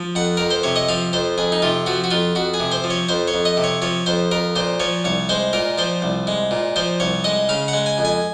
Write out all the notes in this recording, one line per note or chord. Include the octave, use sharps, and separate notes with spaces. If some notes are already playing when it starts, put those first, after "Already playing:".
Already playing: F3
F2 F#5
F2 A#4
C5
C3 C#5
D#5
F3 F5
F2 C5
F2 G#4
D#4
C3 F4
F3 F#4
F#4
F2 F4
F2 F#4
G#4
C3
C5
F3
C#5
F2 C5
C#5
F2
D#5
C3
C#5
F3 C#5
F2 C5
F2 A#4
A#2 C5
F3 C#5
C2 C#5
G#3 C5
A#2 A#4
F3 C5
C2
G#3
A#2
F3 C5
C2 C#5
G#3 D#5
C#3 F5
F#5
G#3
G#5
F2
G#5